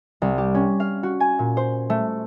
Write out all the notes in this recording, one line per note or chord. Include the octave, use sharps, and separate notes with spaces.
C2
G4
C#4
F5
F#4
G#5
A#2
C5
A3